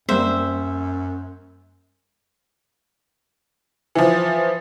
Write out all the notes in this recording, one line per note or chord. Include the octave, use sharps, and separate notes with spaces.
F#2 G3 A#3 C4 C5 E5
E3 F3